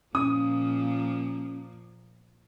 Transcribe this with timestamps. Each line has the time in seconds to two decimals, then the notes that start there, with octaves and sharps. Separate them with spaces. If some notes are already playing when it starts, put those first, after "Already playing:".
0.15 A#2 F3 A#3 C#4 D#6